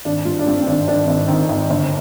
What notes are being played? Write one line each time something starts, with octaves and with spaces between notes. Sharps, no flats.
G#1 D4
G2 F4
D4
G2 C4
C4
G#1 D4
G#1 D4
G#1
D#3 C4
G#1
G1